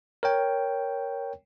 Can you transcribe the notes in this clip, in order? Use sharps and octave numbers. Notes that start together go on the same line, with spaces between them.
A#4 C#5 G5